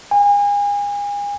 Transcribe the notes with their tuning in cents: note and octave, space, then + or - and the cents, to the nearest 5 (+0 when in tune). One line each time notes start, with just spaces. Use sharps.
G#5 -35